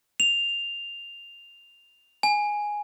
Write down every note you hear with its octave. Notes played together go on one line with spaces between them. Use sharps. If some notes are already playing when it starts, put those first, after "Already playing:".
F7
G#5